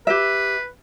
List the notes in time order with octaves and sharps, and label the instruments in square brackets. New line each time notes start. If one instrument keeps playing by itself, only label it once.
[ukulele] G4 E5 [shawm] B4